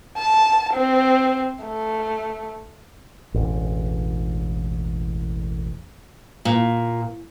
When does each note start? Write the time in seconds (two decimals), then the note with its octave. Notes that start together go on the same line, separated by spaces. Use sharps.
0.17 A5
0.74 C4
1.63 A3
3.34 E1 A1
6.45 A#2